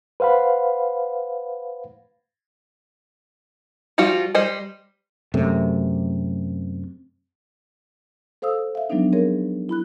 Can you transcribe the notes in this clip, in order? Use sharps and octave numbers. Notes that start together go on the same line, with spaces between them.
B4 C5 F5 F#5 B5
F3 G3 F4 F#4
G3 C5 D#5
F#2 C3 A3
A4 C5 F5 D#6 E6
E5 F5
F3 F#3 G#3 B3 D4 D#4
C4 G#4 A#4 C#5
E4 B5 F#6